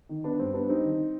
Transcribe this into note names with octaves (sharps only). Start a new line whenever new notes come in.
D#3
D#3 B3 D4
G2 C4
G3 B3 D4
G3 C4 D#4
D#3